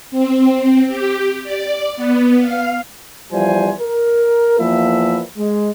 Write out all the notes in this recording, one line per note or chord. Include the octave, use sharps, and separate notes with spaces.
C4
C4
G4
D5
B3
F5
E2 F3 G3 C5 G#5
A#4
E2 F3 A#3 B4 E5
G#3